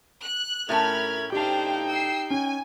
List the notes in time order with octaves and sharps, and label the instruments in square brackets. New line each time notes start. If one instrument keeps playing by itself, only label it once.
[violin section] F#6
[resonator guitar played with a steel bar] A2 A3 C#4 [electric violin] A#4 G#6 [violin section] B5 F6
[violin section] D4 C5 F5 [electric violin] D#4 G5 [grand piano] G4 A5
[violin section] E6 C7
[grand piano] C#4 [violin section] G#5